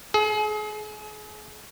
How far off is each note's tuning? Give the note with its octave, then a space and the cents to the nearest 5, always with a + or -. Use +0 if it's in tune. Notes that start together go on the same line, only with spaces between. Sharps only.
G#4 +35